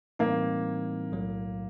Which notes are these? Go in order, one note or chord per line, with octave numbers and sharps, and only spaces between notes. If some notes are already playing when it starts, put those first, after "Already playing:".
A2 E3 G3 A#3 C4 D#4
B1 A2 F#3